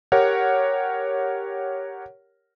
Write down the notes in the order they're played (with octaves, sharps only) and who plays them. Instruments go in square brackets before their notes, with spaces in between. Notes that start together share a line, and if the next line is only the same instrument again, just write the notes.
[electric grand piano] G4 A#4 C#5 F#5